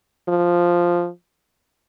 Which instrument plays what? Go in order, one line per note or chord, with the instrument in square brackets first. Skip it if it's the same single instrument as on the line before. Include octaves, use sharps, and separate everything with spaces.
[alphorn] F3